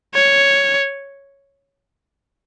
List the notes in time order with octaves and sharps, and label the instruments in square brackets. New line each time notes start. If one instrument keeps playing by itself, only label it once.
[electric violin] C#5